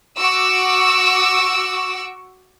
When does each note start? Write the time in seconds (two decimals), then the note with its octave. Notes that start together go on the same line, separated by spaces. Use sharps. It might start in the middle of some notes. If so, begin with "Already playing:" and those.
0.18 F#4 C#6 D6 E6